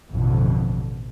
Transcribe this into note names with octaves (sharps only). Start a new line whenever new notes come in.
A1 F2 B2 D3